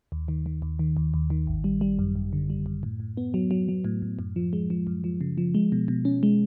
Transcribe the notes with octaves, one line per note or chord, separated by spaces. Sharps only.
D#2
D#3
D#3
D#2
D#3
D#2
D#2
D#3
G#1
G3
G3
F#2
G#1
D3
G3
F#2
A2
A2
B3
F#3
F#3
F#3
A2
A2
F#2
F3
G#3
F3
F#2
F3
C#3
F3
G#3
B2
B2
C#4
G#3